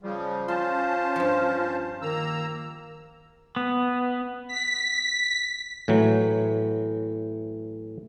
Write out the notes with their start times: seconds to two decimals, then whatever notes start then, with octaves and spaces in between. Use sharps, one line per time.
0.03 C#3 F3 G3
0.48 C#4 F4 C5 A5 C6
1.16 G2 F3
2.02 D#3 A#3 A#5 E6
3.56 B3
4.48 B6
5.88 A2 E3 F#3